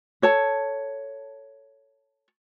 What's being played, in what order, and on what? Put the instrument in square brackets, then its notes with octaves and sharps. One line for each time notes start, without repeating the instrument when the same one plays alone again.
[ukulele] A4 C#5 A5